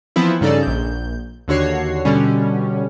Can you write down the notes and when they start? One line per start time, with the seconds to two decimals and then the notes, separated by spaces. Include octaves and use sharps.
0.16 E3 F3 B3 C4 E4
0.41 G2 C#3 D#4 A4 D5
0.63 A#1 G6
1.48 D#2 D3 F#4 C#5 C7
2.05 B2 D3 G3 C#4